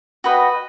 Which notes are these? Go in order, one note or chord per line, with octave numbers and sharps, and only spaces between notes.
F#4 B4 D#5 G5